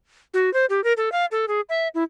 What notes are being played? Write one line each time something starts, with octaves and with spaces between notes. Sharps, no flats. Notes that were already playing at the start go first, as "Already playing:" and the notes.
F#4
C5
G4
A#4
A4
F5
A4
G#4
E5
E4